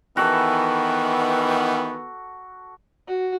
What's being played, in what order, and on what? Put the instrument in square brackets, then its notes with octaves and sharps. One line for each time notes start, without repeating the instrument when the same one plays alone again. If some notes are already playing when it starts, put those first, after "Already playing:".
[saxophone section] D#3 E3 [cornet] B3 [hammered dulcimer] F#4 A4
[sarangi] F#4